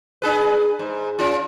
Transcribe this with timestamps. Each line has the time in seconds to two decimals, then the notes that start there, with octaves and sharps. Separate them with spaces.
0.22 D4 G#4 B4
0.79 G#2
1.19 C#4 F4